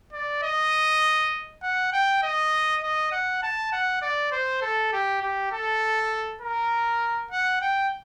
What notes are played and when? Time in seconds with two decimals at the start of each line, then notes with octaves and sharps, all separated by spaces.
0.13 D5
0.42 D#5
1.63 F#5
1.92 G5
2.23 D#5
2.83 D#5
3.12 F#5
3.42 A5
3.72 F#5
4.01 D5
4.32 C5
4.62 A4
4.93 G4
5.22 G4
5.52 A4
6.41 A#4
7.31 F#5
7.61 G5